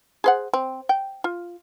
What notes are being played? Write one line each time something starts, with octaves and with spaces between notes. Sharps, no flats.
G#4 C5 F#5
C4
G5
F4